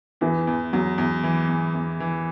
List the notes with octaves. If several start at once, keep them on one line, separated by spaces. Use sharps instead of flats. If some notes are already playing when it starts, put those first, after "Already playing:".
E2 E3
E2
E2 F#3
E2
E3
E2
E2
E3